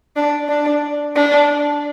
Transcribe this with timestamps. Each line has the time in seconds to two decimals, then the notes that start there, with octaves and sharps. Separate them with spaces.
0.16 D4
0.49 D4
1.16 D4